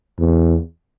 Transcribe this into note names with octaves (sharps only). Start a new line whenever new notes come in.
E2